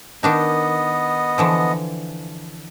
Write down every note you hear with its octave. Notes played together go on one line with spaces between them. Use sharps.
D#3 B3 D4 D#4 D#5
D3 E3 F3